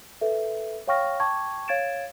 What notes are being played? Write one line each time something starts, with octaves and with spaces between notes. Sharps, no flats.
A4 B4 E5
C#5 F5 G5 C#6 F6 A#6
G5 A5 C#6 D6 G#6
C#5 F5 G#6 A6 D7 E7